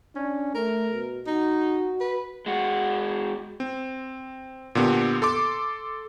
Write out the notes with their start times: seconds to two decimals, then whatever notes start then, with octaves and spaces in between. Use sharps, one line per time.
0.16 C#4 D4
0.55 A3 A#4
0.93 B2
1.27 D#4 F#4
2.00 B4
2.46 G#3 F#4
3.60 C4
4.75 A#2 D3 B3 G4
5.22 A4 C6 D6